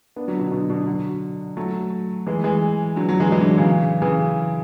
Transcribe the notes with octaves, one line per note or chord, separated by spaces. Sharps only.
B3 D4
D3 F#3
B2 D3
B2 D3
B2 D3
D3 F#3
F#3 A3
E3 G#3
E3 G#3
D3 F#3
D3 F#3
E3 G#3
E3 G#3
D3 F#3
C#3 E3
C#3 E3